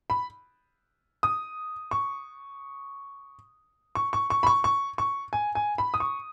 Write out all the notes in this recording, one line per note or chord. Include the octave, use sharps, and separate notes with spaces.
B5
D#6
C#6
C#6
C#6
C#6
B5
C#6
C#6
C#6
G#5
G#5
B5
D#6
C#6